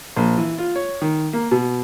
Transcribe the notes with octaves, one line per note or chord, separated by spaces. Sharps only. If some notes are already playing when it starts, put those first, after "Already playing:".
A#1
E3
F4
C#5
D#3
A#3
B2